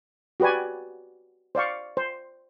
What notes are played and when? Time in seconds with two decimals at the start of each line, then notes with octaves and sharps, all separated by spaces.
0.40 F#4 G4 B4 D5 G#5
1.55 C5 D5 F5 C#6
1.97 C5